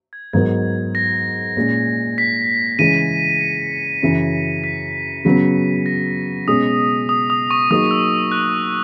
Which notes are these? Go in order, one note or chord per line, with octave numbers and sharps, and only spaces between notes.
G#6
G#2 F#3 B3 D#4 A#4 G#6
A#6
A#2 G#3 C#4
B6
C#3 E3 G#3 C#4 D#7
C#7
F#2 C#3 E3
B6
C#3 F#3 B3
A#6
B2 G#3 C#4 D#6
D#6
D#6
C#6
F#3 A#3 D#4 G#4 D#6
E6
F#6